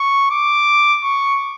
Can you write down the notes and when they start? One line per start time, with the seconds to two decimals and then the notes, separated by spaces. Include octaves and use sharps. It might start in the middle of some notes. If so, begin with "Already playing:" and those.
Already playing: C#6
0.31 D6
1.03 C#6